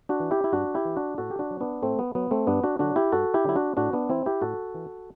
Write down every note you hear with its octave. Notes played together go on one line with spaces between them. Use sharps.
D4 F#4
E3
E4 G4
E4
G2 D4 F#4
E4 G4
E3
D4 F#4
A2 F#4 A4
G4
D4 F#4
F#3
B3 D4
A2 A3 C4
B3
F#3 B3
A3 C4
G2 B3 D4
D4 F#4
D3 F#3 D4 F#4
E4 G4
G2 F#4 A4
E4 G4
D3 F#3 E4
D4 F#4
A2 D4 F#4
B3 D4
E3 C4 E4
E4 G4
A2 F#4 A4
E3